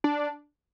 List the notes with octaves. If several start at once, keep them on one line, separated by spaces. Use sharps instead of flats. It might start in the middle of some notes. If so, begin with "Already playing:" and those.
D4